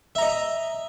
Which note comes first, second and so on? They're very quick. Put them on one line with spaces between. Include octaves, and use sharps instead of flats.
E5 A#5 D#5